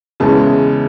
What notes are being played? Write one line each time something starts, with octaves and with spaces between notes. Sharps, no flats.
E2 C#3 E3 G#3 A5